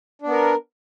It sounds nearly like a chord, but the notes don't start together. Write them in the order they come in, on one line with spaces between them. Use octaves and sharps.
D4 B3 A#4